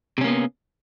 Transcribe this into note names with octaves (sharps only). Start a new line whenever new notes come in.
C3 A#3 B3 C#4